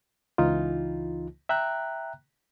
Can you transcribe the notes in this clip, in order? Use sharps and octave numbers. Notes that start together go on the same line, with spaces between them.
C#2 E3 D#4 F4
E5 G5 A#5 F#6